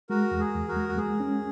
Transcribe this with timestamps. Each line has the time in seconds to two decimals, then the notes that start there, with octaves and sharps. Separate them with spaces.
0.10 G#3 F#4 A#4
0.31 E2
0.40 G#4
0.54 E2
0.68 F#4 A#4
0.77 G#3
0.89 F#4
0.98 G#3 G#4
1.20 C#4